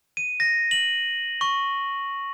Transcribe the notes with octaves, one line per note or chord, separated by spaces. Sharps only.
D#7
A#6
F#7
C#6